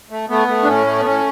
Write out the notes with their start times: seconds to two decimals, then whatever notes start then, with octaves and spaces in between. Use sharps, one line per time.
0.10 A3
0.29 A3 B3
0.48 A3
0.63 D4
0.67 A2 C#4
0.87 A3
1.00 B3
1.05 A2 C#4